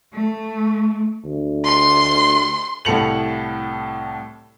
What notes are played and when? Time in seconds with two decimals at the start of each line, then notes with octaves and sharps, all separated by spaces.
0.13 A3
1.24 D2
1.65 C6
2.85 C2 A2 A4 C#7 F7 F#7